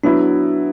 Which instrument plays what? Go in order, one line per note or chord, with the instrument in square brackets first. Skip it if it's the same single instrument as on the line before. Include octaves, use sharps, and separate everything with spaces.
[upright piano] F#3 B3 E4 [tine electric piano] D4